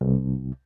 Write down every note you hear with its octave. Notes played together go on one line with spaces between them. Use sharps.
C2